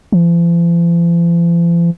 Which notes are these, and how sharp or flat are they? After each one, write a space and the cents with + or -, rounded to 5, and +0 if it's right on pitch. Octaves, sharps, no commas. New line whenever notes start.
F3 -45